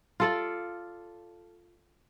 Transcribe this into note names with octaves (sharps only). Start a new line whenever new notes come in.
F4 A4 D5